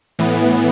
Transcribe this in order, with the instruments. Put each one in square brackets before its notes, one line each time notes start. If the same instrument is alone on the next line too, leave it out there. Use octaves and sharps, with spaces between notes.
[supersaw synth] A2 E3 B3